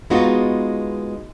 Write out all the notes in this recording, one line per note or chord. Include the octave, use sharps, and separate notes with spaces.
G#3 B3 D#4 F4 F#4